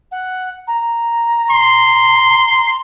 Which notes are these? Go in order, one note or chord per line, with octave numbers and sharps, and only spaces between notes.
F#5
A#5
C6